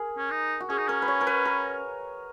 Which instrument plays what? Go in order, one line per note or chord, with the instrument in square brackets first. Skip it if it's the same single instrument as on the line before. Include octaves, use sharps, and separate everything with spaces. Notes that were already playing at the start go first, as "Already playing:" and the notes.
Already playing: [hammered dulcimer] G#4 A#4
[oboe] C#4
D#4
[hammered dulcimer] F#4
[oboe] C#4 [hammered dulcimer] G#4
[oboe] D#4
[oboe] C#4 [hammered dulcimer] A#4
[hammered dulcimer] B4
C#5
A#4
B4
A#4